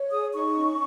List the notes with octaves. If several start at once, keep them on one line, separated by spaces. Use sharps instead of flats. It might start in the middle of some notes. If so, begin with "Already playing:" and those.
Already playing: C#5
G#4 D#6
D#4 C#6
C#4